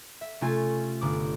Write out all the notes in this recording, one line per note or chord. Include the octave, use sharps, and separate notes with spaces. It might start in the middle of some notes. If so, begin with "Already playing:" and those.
E5
C3 A3 C#4 F4 G#5 A6
G1 D6